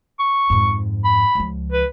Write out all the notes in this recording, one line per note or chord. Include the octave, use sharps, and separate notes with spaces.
C#6
F2 G#2
B5
C#2 F3
B4